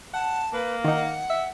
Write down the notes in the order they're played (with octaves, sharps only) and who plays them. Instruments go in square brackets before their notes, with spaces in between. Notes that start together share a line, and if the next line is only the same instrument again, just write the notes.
[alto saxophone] F#5 [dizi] A5
[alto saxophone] A#3 [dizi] B4
[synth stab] D#3 D#4 [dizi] F#5
[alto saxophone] E5